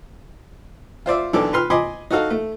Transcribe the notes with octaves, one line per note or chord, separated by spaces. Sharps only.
F4 C5 D5 E5
B1 E3 D4 A4 D6
B4 C6 F6
D#5 G#5 B5 C6 D6
D#4 F#4 A4 F5
A3